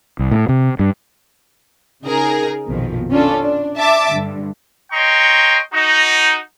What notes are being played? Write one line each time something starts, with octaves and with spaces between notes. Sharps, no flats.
C2
A2
C3
G2
C#3 D#4 G#4 A#4
A#1 F2 B2 D#3 F3
C#4 D4 F4 A4
D4
E5 A5 D6
G2 D3
C#5 D#5 G5 A#5 C6 C#6
D#4 F#4